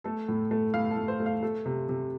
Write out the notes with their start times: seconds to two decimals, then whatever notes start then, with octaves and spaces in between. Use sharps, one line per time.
0.04 A3 A4
0.28 A2
0.51 A3
0.74 A2 F5
0.91 A4
0.97 A2
1.08 C5
1.20 A3
1.26 F5
1.43 A3 A4
1.66 C3
1.89 C3